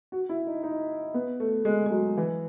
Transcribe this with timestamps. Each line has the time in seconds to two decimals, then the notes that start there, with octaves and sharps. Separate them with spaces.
0.12 F#4
0.29 E4
0.47 D#4
0.63 D#4
1.14 B3
1.40 A3
1.65 G#3
1.86 G#3
1.91 F#3
2.17 E3